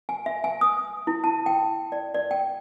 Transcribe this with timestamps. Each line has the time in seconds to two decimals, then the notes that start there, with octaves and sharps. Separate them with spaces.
0.09 G#5
0.26 E5
0.44 G#5
0.61 D#6
1.07 E4
1.24 A5
1.46 G5
1.92 D5
2.14 D5
2.31 G5